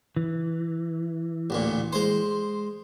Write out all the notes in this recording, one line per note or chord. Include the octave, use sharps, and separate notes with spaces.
E3
A1 D2 A#2
G#3 C5